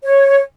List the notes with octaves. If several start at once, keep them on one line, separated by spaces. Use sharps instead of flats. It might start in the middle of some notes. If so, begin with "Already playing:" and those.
C#5